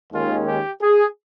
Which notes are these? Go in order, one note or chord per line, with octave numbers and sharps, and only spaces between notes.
D#2 D#3 G#3 C#4 F4
G4
G#4